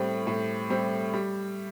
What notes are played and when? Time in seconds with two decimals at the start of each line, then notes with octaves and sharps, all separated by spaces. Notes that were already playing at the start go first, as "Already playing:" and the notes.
Already playing: A2 G3 C4 G4
0.27 A2
0.70 G3 C4 G4
1.14 G3